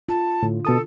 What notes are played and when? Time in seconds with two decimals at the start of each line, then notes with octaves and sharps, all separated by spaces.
0.09 F4 A5
0.43 A2 D3
0.65 B2 A4 A5 D#6